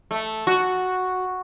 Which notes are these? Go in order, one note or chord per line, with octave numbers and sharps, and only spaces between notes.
A3
F#4